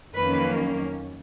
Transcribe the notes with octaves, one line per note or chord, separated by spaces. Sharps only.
F2 D#3 F#3 A#3 C#4 B4